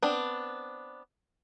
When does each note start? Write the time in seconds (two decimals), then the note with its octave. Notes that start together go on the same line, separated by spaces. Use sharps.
0.03 B3 C4 D4